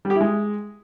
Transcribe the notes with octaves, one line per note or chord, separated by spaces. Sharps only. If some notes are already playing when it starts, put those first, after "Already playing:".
G3
G4
E4
G#3